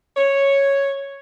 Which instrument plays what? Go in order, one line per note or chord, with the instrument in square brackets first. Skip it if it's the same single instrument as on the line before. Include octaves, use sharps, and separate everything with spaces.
[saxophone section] C#5